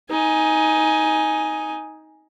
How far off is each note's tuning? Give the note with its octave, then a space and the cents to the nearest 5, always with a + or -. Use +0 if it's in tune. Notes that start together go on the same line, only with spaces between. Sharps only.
D#4 +15 G#5 +0